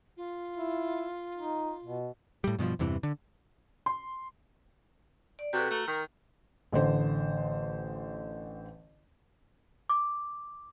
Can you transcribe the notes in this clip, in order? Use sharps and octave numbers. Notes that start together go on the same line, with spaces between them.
F4
E4
D#4
B2
A2 G3
G2 B2 E3 F3
E2 G2 C3 E3
D3
C6
D5
C3 F#4 A4 B4
A3 A#5
D#3 A#4
A1 D3 C5
D6